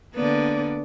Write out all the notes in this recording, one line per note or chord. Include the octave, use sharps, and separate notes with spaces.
D3 A#3 B3 D5